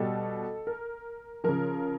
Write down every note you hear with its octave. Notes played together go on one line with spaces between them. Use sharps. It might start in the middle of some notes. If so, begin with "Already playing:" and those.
Already playing: B2 G3 A4
A#4
C#3 F3 A#4